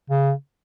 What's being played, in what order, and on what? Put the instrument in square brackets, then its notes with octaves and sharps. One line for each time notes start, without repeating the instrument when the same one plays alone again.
[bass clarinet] C#3